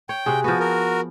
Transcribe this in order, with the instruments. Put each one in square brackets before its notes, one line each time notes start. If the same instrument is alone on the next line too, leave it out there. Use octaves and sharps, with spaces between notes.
[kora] C#5 [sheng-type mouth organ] G5
[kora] C3 F#4 G#4
[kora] F3 B3 [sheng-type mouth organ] F#4
[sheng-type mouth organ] F#4 A#4